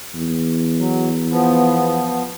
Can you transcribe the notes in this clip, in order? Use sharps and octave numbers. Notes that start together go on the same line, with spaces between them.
E2
F#3
F3 B3